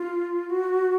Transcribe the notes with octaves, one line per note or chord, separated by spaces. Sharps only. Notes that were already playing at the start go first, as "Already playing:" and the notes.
Already playing: F4
F#4